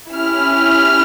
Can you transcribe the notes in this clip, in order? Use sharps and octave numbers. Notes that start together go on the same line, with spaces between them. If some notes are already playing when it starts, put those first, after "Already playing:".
C#4 E4 G4 F6